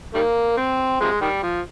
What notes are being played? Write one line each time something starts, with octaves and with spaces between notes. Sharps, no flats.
D#3 G3 A#3
C4
C3 F3 G#3
D#3 G3
F3